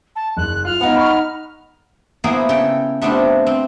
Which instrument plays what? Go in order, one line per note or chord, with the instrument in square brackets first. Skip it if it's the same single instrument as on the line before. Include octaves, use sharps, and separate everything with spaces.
[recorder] A5
[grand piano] F#1 [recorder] F#6
[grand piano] F4 [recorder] F6
[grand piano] B3 [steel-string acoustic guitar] D#4 F#5
[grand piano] B5 C#6
B5
[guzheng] A#3 B3 E4 G#4 C5
C#3 A4 G5
A3 B3 C4 D4 F4 G4
C4